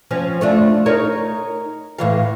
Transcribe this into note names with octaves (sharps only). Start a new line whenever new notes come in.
F3 C4 C#4
A3 D4 F4
D#4 A#4 C#5
A2 E3 F5